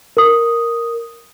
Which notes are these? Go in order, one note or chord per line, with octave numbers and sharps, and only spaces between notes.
A#4 D#6